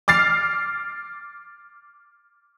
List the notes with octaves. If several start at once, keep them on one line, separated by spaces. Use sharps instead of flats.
D6 F6 A6 C7